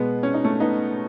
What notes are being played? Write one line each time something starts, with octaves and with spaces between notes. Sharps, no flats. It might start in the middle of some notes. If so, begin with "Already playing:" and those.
Already playing: B2 G#3 B3
C#4
D#4
A3 C#4
B3 D#4